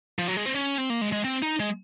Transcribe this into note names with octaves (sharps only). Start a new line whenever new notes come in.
F3
F#3
G#3
C4
C#4
C4
A#3
G#3
G#3
C4
D#4
G#3